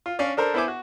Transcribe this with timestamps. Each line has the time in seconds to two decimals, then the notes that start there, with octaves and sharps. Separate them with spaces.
0.06 F4
0.19 C#4 D4 D5 F5
0.37 D4 A4 A#4 C5
0.54 B3 E4 C5 E5 G#5 D6
0.68 F#4